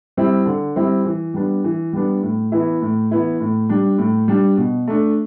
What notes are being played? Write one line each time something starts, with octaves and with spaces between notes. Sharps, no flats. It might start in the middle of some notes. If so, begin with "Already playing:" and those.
G3 C4 E4
D3
G3 C4 E4
E3
G3 B3 D4
E3
G3 B3 D4
A2
E3 B3 E4
A2
E3 B3 E4
A2
G3 D4
A2
G3 D4
B2
A3 D4